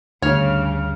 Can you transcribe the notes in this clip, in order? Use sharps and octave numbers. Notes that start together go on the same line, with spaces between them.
D2 G2 C#3 C#5 F6